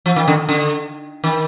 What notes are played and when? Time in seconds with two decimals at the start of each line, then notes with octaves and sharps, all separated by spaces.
0.06 F3
0.16 D#3
0.28 D3
0.49 D3
1.24 D#3